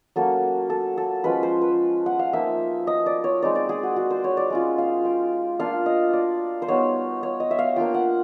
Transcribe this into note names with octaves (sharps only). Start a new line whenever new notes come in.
F#3 A#3 C#4 A4
A4
A4
F3 G#3 C#4 B4
C5
B4
F#5
F5
F3 A#3 D#4 E5
D#5
D5
C#5
G#3 C4 D#4 D5
D5
G#4
F#4
F#4
C5
C#5
D5
G#3 C#4 F4
F5
G5
A#3 D4 F4 F5
D#5
D5
C5
G3 B3 D#4 C#5
C#5
D#5
E5
F5
A#3 D4 F4 G5
F#5